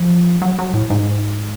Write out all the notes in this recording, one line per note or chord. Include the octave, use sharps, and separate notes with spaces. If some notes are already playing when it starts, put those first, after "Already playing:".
Already playing: F3
F#3
F#3
A2
G#2